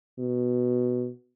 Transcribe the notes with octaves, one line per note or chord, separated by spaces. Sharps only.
B2